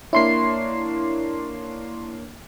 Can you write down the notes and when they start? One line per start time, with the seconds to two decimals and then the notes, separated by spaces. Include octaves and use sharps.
0.13 A#3 D4 E4 C#5 C6 C7